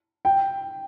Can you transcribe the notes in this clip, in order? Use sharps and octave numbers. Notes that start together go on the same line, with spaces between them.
G5